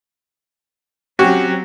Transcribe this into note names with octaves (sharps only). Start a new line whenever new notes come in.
F#3 C4 C#4 F#4 G4